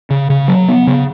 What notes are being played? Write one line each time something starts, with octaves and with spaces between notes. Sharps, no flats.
C#3
C#3
F#3
B3
C#3